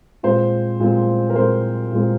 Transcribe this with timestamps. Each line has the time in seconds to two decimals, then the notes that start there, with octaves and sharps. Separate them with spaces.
0.23 A#2 G#3 C4 C5
0.80 A#2 G#3 C4
1.30 A#4
1.35 A#2 G#3 C4 C5
1.92 A#2 G#3 C4